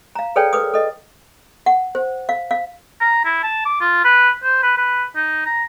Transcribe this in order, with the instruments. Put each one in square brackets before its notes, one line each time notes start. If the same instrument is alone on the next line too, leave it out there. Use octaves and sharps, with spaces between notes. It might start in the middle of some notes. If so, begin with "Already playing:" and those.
[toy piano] F5 A#5
G#4 A4 B4 C#5 D5 G5
A#4 B4 D6 D#6
A4 D#5
F#5
C5
F5
F5
[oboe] A#5
E4
A5
D6
F4
B4
C5
B4
B4
D#4
A#5